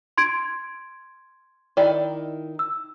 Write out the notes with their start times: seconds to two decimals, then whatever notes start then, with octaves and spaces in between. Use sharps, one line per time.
0.18 C6 G#6 D7
1.77 D#3 E4 D5
2.59 E6